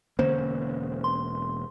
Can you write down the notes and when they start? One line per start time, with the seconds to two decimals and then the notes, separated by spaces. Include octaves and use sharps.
0.19 E1 D3 A#3 C#4 C5
1.04 C6